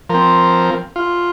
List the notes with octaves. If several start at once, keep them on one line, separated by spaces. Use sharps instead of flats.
F3 C4 A#4
F4